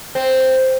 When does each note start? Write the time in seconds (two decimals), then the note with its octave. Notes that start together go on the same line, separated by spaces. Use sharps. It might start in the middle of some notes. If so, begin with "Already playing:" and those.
0.15 C4